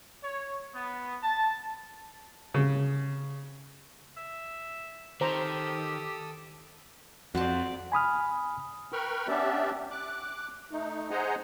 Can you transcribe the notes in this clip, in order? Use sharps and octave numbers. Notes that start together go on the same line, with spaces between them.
C#5
B3
A5
C#3
E5
D#3 G4 A4 C5 A#5 D#6 E6
F2 C4 F#4 C5 D5 A5
G#5 B5 D#6 F6
A#4 B4 G5 B5 C#6 F6
B3 C#4 D4 G4 D5 E5
D6 F#6
A3 D#4
G#4 C5 D#5 F#5 G#5 A#5